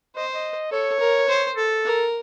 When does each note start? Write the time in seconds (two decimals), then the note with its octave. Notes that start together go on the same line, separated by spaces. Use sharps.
0.15 C5 D#5
0.34 D#5
0.71 A4 C#5
1.00 A#4
1.29 C5
1.56 A4
1.85 A#4